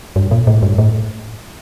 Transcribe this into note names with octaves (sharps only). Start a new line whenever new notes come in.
G2
A#2
A2
G2
A2